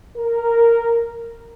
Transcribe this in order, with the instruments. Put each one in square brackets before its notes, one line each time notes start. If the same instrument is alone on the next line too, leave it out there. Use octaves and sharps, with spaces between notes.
[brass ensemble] A#4